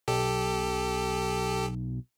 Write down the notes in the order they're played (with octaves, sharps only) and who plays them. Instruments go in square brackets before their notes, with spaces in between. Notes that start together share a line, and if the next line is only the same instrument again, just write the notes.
[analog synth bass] B1 [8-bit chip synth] G4 A4